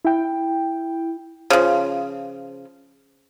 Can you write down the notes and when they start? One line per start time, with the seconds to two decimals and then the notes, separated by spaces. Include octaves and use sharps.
0.05 E4 G5
1.50 C#3 F3